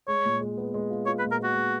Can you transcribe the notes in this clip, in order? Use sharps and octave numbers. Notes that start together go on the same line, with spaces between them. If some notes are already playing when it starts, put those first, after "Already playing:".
G#3 C#5
A#2
G#3
B3
G#3
F4
F4 C#5
B4
A#2
A#4
B3 F#4
G#3